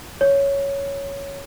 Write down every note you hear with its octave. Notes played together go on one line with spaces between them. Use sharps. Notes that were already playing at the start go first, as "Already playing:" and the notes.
C#5